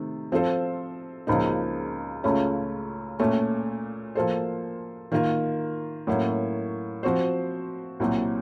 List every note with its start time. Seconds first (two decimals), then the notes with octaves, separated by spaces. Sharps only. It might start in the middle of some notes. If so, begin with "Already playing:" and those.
Already playing: C3 D#3 A3
0.32 F3 C4 F4 A4 C5
1.27 C#2 C#3 F3 A#3 D#4
2.24 C#2 C#3 A3 C#4 F4
3.20 A#2 A3 C#4
4.15 F3 A#3 F4 A4 C5
5.12 D#3 A#3 F4 A#4
6.07 A2 F#3 A#3 C#4
7.03 F3 C4 F#4 C5
8.00 C2 A#2 F#3